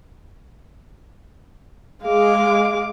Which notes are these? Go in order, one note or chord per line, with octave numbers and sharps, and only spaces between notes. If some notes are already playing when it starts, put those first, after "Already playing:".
G#3 F5 D6